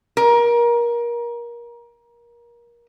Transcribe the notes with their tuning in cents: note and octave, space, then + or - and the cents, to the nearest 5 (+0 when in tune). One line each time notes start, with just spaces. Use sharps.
A#4 +25